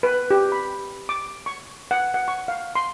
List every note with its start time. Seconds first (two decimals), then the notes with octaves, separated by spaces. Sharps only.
0.03 B4
0.31 G4
0.52 B5
1.09 D6
1.46 C#6
1.91 F#5
2.14 F#5
2.28 C#6
2.48 F5
2.75 C6